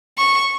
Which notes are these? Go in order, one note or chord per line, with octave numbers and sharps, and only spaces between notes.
C#6